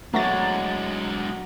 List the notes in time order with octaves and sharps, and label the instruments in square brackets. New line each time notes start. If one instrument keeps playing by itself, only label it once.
[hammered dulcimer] F#3 A#5 [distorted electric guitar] G#3 D4 [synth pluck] A3 A6